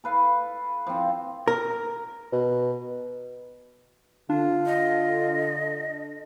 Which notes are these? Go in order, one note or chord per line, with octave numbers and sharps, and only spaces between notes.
A4 B4 F5
F3 C4
A#4
B2
D3 D4 F4
D#5